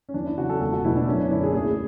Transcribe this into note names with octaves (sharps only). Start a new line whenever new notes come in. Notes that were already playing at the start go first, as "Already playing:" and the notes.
C#4
E2 D4
E4
C#3 E3 F#4
A4
E1 A4
F#4
E2 B2 A3 E4
D4
F#2 C#4
D4
D3 A3 E4
G#4
D2 G#4